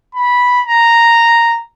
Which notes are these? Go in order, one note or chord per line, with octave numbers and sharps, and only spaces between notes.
B5
A#5